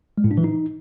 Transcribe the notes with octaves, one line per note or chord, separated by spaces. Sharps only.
G#3
A2
D4
E3
D#4